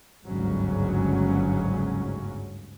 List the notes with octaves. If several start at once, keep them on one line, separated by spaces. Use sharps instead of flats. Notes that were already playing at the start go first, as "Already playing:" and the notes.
G1 D2 G#2 C#3 F#3 C#4